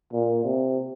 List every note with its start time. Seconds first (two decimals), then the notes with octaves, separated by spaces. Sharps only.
0.13 A#2
0.44 C3